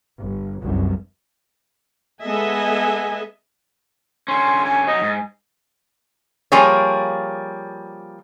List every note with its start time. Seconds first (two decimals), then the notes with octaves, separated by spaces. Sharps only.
0.22 G1
0.61 G1 C2 F#2
2.23 G#3 B3 A4 D#5 E5 G#5
4.28 D3 C#4 C6
4.65 G#5
4.88 F#3 D#4 D#5
5.02 G#2
6.52 F3 G3 A#3 G#4 C#5